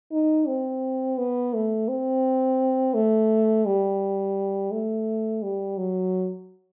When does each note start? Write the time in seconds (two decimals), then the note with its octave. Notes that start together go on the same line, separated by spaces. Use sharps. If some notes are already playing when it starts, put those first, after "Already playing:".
0.12 D#4
0.48 C4
1.18 B3
1.54 A3
1.88 C4
2.94 A3
3.66 G3
4.71 A3
5.43 G3
5.77 F#3